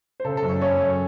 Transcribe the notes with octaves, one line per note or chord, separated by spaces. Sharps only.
C5
C#3 A4
A4
F#2
C#4 C#5
F#2 C#4 C#5
F#2